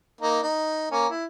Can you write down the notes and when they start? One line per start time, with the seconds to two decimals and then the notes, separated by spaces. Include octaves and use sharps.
0.21 A#3 D#4
0.42 D#4
0.91 A#3 C#4
1.10 E4